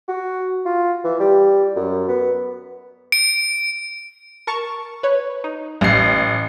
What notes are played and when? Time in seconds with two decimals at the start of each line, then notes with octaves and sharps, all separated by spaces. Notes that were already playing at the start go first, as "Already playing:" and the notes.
0.08 F#4
0.65 F4
1.04 E3
1.20 G3
1.76 F#2
2.08 B3
3.12 D7
4.47 A#4 A5 C#6
5.03 B4 C#5
5.44 D#4
5.81 A1 C7